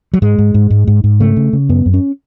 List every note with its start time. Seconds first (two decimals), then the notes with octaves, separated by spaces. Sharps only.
0.14 F#3
0.22 G#2 G#3
0.39 G#2
0.54 G#2
0.71 G#2
0.88 G#2
1.04 G#2
1.20 C#3 A3
1.37 C#3
1.53 C#3
1.69 F#2 B3
1.86 F#2
1.94 C#4